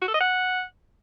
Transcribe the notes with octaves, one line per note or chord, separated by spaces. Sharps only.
F#4
A4
D#5
F#5